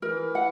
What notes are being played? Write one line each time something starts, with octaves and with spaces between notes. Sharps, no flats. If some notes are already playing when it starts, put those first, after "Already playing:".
E3 A#4
F#5